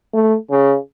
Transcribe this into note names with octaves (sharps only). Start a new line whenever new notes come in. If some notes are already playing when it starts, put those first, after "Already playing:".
A3
C#3